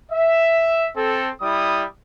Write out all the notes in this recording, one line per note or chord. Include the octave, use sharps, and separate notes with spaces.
E5
C4 A4
G3 E4 D#6